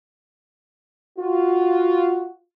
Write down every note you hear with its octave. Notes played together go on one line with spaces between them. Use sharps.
F4 F#4